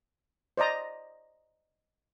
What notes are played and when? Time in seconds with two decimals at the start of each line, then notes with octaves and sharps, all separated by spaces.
0.57 C5 D5 D#5 A#5